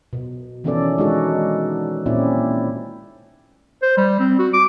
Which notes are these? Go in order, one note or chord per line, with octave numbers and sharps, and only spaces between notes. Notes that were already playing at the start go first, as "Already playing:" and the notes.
B2
D#3 E3 B3 C#4 A4 D5
G#3 D4 D#4 F#4 A4
A#2 C4 C#4 E4 D5
C5
G3
C4
F#4
D6